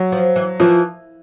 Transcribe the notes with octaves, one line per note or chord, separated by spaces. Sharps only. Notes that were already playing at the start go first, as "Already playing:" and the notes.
Already playing: F#3
F3
E3
E3 F3